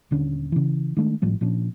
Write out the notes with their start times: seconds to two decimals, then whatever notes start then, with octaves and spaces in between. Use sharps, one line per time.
0.11 D#1 D3 C#4
0.52 C#3 E3
0.97 D#3 G#3 A3 D4
1.22 G#1 A2 F3 G3
1.41 A#2 F3 C#4 D4